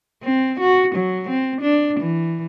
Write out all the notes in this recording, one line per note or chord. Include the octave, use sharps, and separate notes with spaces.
C4
F#4
F#3
C4
D4
E3